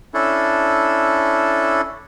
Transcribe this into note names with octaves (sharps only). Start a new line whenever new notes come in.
C#4 D4 E4 A4